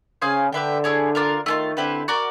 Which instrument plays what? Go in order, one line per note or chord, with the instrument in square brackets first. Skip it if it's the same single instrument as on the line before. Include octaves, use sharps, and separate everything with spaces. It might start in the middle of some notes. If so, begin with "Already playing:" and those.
[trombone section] C#3 [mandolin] G#4 C5 F5 G#5
[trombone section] D3 [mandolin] G4 B4 E5 G5
[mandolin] E4 G#4 C#5
D4 F4 A#4
[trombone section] D#3 [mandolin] A3 D4 F4
[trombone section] D3 [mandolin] C4 E4 G4 B4
[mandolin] F#4 A#4 D5